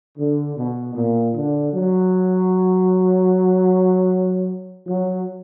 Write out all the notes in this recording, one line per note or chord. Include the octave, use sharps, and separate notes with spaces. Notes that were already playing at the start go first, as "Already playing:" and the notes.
D3
B2
A#2
D3
F#3
F#3